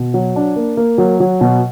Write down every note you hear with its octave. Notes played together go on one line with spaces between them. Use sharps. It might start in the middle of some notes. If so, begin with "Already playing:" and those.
Already playing: B2
F#3
D4
A#3
A#3
F#3
F#3
B2